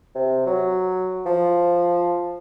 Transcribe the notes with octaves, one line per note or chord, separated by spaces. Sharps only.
C3
F#3
F3